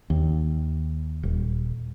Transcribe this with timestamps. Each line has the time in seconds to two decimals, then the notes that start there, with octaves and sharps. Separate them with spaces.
0.10 D#2
1.23 D#1